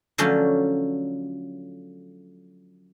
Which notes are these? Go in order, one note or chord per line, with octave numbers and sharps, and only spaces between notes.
D3 F3 F#3 A3 C#4